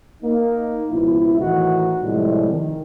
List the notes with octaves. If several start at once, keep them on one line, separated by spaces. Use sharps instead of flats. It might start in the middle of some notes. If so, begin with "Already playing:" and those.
A#3 D#4
C#2 B2 F3 E4
A2 D#3 E3 D#4 F#4
A2 C3 F3 G3 G#3
D#3